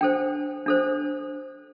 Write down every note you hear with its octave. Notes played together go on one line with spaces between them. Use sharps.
D4 A4 C5 G5
D4 A4 C5